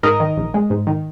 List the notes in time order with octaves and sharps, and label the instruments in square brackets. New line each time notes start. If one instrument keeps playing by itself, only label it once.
[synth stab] G#2 A#4 D#5
D#3
A#1
G#3
G#2
D#3